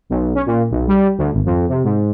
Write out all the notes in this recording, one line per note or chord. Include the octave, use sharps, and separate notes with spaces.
B1
C#4
A#2
B1
G3
D2
G#1
F2
C3
G#2